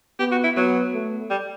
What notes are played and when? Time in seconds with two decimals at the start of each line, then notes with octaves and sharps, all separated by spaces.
0.19 B3 G4
0.32 F#4
0.44 E4
0.57 F#3 B3
0.93 A3
1.30 G3